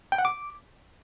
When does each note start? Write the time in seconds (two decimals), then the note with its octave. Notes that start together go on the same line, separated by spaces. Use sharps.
0.12 G5
0.18 F#5
0.25 D6